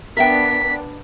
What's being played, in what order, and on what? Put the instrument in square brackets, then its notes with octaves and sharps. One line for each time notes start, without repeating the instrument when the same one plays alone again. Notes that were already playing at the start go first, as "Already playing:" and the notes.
[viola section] B3 D4 [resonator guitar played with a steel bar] A#4 E5 G5 [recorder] B6